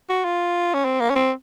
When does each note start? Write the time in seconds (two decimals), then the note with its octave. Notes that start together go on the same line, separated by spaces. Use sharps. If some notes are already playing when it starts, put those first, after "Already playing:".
0.10 F#4
0.24 F4
0.74 C#4
0.85 C4
1.00 A#3
1.10 C#4
1.16 C4